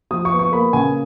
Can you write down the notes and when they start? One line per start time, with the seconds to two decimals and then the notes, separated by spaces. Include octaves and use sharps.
0.11 F3 D#6
0.25 C#6
0.32 B3
0.39 C#6
0.52 A#3 B5
0.73 C#3 G#5